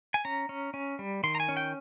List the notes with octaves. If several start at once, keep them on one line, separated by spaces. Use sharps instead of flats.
G#5
C#4 A#5
C#4
C#4
G3
D#3 C6
A#5
G#5
C#4
G5